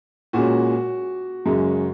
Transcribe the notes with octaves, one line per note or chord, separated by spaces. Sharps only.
A#2 G#3 C#4 F#4
F#2 C#3 G#3